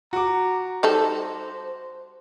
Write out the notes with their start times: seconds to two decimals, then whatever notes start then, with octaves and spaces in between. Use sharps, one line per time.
0.13 F#4 A#5 D6
0.83 G3 D#4 A4 C5